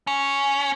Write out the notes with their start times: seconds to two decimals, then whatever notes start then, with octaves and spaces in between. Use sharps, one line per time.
0.07 C#4